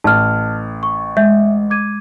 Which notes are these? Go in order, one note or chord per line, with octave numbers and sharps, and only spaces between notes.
A1 A5 F6
C#6
G#3 E5 G6
D6 G#6 D#7